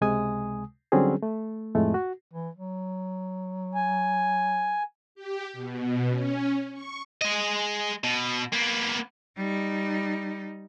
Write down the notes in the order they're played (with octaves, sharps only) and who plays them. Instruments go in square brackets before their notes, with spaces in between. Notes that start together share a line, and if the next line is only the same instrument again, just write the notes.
[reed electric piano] C#2 C3 G#3 G#5 D#6
D3 F#3 G3 C4 C#4 G#4
A3
F2 A2 G#3 A3
F#4
[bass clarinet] E3
F#3
[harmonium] G#5
[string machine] G4
B2
C#4
C#6
[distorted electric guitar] G#3 D#5
B2
A#3 B3
[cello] G3 D#4